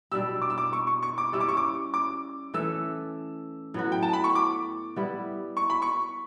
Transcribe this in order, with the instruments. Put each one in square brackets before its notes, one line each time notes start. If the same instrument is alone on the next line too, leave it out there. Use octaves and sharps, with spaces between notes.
[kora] B2 G3 D4 G4 [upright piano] E6
[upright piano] D6
E6
D6
C#6
C#6
C#6
D6
[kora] G3 C#4 E4 G4 [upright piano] E6
[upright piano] D6
C#6
D6
D6
[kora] E3 A3 C#4 [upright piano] E6
[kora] A2 F#3 B3 F#4
[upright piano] G5
A5
B5
C#6
D6
[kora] G3 B3 E4
[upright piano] C#6
B5
C#6